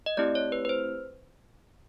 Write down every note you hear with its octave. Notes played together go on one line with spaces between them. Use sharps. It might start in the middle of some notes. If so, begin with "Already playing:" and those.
D#5
A3 C4 E4 G4 D5
C#5
B4
B4
C5